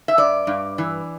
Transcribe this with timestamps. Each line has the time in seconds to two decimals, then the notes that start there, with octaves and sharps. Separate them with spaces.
0.08 E5
0.17 G2 D5
0.47 G2
0.78 E3